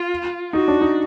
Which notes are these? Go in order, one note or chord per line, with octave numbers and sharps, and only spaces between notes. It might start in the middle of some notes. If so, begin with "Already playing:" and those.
Already playing: F4
D#4 F#4
D4
D#4